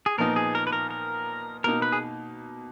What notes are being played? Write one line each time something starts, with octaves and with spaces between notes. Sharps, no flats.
G#4
A#2 F3 B3 D#4 A#4
G#4
A#4
B4
A#4
A#4
B2 A#3 D#4 A#4
B4
G#4